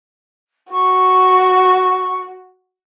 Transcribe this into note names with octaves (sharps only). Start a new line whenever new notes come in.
F#4 C#6